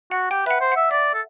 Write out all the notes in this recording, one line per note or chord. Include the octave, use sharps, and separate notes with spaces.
F#4 F#5
G4 G5
B4 E5 F#5
C5
F#5
E5
D5 E5
A4